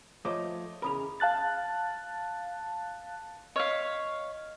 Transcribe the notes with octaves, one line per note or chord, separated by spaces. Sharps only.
F3 A3 C5 C#5 D#5 D6
E2 C#3 A#4 B5 D#6 F7
F5 A5 F#6 A6
C#5 D#5 F5 F6 B6